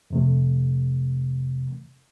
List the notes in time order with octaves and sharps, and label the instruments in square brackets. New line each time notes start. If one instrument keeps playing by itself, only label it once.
[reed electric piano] F2 C3 A3